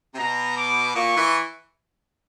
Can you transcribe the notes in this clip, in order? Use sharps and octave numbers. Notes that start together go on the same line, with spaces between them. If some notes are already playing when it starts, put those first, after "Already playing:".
C3
B2 A#5
D6
A#2 C#6
E3